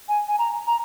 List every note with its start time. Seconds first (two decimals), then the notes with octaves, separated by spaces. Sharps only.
0.09 G#5
0.28 G#5
0.38 A#5
0.67 A#5